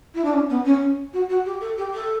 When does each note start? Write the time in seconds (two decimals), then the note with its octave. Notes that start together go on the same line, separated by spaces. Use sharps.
0.14 E4
0.24 D4
0.33 C#4
0.49 B3
0.65 C#4
1.13 F#4
1.29 F#4
1.45 G4
1.61 A4
1.77 G4
1.93 A4